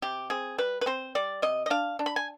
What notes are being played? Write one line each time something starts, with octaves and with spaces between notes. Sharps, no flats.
C3 G4
C4 G#4
G3 B4
B4
C4 C5
G3 D5
C3 D#5
D#5
D4 F5
D4
B5
G#5